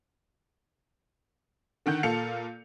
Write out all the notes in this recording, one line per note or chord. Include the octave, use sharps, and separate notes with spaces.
D3 D#3 F#5 G6
A#2 A4 F5 C#7 F7